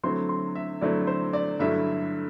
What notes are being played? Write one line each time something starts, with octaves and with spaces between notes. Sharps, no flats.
D3 F#3 A3 C4 E4 C6
C6
E5
D3 F#3 A3 C4 E4 D5
C5
D5
G2 D3 F#3 A3 E4 E5